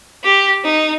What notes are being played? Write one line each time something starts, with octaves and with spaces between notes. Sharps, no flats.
G4
D#4